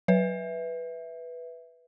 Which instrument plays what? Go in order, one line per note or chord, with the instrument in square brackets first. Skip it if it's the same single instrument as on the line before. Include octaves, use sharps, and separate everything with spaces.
[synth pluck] F#3 [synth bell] B4 E5